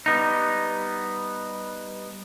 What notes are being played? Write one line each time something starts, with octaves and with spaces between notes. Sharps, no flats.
G3 B3 D#4